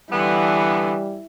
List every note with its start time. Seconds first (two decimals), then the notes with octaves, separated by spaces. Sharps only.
0.11 D3 E3 G3 B3